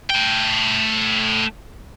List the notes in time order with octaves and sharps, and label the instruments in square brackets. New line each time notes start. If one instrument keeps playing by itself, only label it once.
[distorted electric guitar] A3 G5